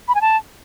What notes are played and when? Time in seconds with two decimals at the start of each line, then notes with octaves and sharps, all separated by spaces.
0.08 B5
0.15 G#5
0.21 A5